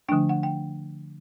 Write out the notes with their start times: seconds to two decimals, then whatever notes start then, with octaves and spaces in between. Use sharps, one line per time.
0.09 D3 F3 A3 D4 G5
0.29 F#5
0.43 G5